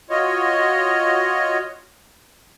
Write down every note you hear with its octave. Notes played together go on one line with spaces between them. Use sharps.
F4 F#4 C#5 D#5